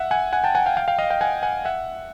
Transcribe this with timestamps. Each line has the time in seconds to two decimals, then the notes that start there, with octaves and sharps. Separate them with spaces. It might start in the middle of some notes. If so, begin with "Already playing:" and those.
Already playing: E5 F#5
0.11 F#5 G#5
0.33 F#5 G#5
0.44 G5 A5
0.55 F#5 G#5
0.66 F5 G5
0.77 F5 G5
0.88 F5 G5
0.98 D#5 F5
1.10 F5 G5
1.21 F#5 G#5
1.43 F#5 G#5
1.65 E5 F#5